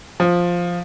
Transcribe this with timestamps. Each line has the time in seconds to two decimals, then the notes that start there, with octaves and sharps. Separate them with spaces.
0.20 F3